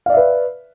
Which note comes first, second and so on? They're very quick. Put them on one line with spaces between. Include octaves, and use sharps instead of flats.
F5 D5 E5 B4